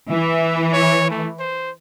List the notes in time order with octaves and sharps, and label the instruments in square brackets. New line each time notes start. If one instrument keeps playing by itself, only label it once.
[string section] E3 [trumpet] E5
[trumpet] C#5
A3
C5